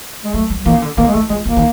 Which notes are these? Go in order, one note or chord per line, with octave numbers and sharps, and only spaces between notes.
G#3
F#3 A3
G3
E3 A#3
C#3
D3
D#3 A#3
G#3
E3 A3
F3 G#3
E3 A#3
D#3